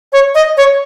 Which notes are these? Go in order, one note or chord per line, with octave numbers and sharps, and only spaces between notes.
C#5
D#5
C#5